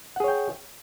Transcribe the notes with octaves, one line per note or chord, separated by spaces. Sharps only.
G#4 C#5 F#5 G5